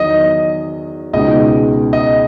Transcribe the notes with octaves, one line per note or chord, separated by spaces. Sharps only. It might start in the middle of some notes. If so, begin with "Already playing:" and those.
Already playing: E2 D#3 F#3 D#5
C#2 B2 G#3 D#4 D#5
D#5